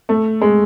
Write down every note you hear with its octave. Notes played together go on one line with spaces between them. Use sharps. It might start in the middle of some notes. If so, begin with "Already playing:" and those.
A3
G#3